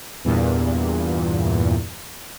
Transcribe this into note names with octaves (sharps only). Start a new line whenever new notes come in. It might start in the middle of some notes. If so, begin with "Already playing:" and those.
E2 G2 A#2